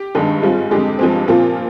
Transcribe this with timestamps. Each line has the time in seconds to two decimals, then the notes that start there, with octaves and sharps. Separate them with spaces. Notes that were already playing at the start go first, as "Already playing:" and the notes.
Already playing: G4
0.15 G2 D#3 G#3 D4
0.42 G#2 G3 C4 F4
0.71 F2 D3 G#3 G4
0.99 G2 F3 G#3 C4
1.28 A#2 F3 C4 F4